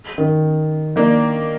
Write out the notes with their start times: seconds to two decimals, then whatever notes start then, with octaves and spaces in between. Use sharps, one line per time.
0.18 D#3
0.96 D#3 A#3 D4